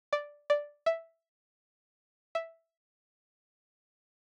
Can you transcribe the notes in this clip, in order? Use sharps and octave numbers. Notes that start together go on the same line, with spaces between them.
D5
D5
E5
E5